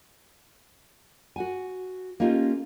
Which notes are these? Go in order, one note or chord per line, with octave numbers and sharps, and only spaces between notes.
F#4 F#5 G#5
A#3 C#4 D#4 F4 G4 A4